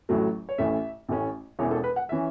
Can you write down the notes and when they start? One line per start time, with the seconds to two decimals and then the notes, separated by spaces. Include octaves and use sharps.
0.09 A1 A2 F#3 A3
0.49 C#5
0.58 A1 A2 A3 C#4 E5
1.09 A1 A2 A3 C#4
1.59 E1 E2 E3 C#4 C#5
1.71 A4
1.84 B4
1.96 F#5
2.09 E3 C#4 E5